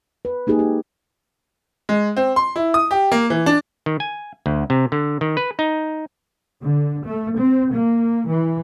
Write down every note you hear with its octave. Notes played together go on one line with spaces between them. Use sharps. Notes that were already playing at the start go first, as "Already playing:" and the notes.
B4
A#3 D#4 G4 G#4
G4
G#3
C4
C6
E4
D#6
G4
A#3
E3
D4
D#3
G#5
D2
C3
D3
D#3
B4
D#4
D3
A3
C4
A#3
E3